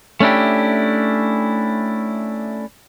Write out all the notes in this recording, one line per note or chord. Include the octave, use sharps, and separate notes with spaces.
A3 C#4 D4 E4 G4